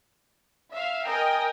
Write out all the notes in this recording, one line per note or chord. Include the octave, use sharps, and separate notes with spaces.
E5 F5
A#4 D#5 G5 G#5